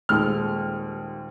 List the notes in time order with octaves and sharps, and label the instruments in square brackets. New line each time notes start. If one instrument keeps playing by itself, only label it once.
[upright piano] D#1 D#2 G#3 F6